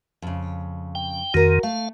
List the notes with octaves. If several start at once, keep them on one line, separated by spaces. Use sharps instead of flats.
F2 C#3
G5
F2 D#3 F#4 A#4
A3 F5